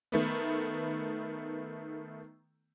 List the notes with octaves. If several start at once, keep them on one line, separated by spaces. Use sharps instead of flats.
D#3 A3 B3